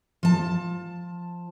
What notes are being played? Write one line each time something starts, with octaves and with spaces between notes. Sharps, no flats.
F3 A5